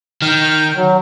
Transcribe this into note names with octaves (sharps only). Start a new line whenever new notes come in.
D#3 F6 G6
F#3